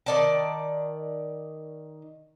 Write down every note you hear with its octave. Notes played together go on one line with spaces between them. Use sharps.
D#3 D5 A5